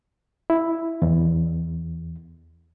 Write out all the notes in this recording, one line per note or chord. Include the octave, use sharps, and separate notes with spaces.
E4
E2